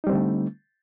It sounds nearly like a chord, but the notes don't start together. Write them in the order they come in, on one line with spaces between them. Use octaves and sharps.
D#4 G3 C4 D3 A3